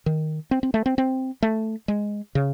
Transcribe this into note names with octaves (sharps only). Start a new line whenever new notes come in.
D#3
C4
C4
A3
C4
C4
A3
G#3
C#3